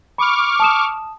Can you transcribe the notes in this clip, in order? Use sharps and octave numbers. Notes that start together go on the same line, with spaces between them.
B5 C#6 D6 F6
A5 D#6 E7